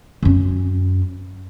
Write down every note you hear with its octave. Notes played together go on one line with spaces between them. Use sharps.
F#2 C#4